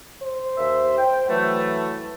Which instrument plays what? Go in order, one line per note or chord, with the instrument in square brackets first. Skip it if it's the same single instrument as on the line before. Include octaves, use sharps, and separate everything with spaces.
[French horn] C5
[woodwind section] D#2 E5
G5
E3 F#3 A3